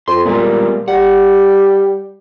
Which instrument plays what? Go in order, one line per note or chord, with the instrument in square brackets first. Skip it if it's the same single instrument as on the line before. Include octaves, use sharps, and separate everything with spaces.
[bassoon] F2 [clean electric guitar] C6
[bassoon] A#2 [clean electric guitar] G3 G#3 B3
[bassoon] G3 [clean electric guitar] F#5